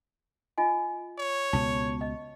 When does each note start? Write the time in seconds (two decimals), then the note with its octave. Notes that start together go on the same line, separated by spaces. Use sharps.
0.58 F4 D#5 G#5
1.19 C#5
1.53 C#2 B2 B3 A5
2.01 D#5